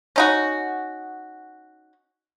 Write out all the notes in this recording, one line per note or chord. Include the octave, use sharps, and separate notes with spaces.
C#4 D#4 F#4